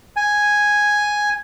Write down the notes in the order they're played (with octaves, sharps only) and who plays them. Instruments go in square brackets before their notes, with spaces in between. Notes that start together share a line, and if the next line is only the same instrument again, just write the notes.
[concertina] G#5